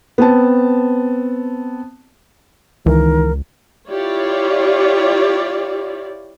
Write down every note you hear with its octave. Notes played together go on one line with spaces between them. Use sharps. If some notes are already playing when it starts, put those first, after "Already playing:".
B3 C4 A5
C#2 D#3 E3 A#4
E4 F4 G4 C#5 D5